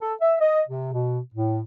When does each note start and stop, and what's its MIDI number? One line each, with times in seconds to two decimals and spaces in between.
0.01 0.14 69
0.21 0.36 76
0.41 0.62 75
0.68 0.89 48
0.93 1.20 47
1.35 1.60 45